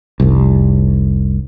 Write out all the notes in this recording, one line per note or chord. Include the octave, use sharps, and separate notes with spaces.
F1 C2